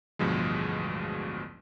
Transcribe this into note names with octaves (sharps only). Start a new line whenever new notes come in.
A1 D2 G2 B2 F3 G#3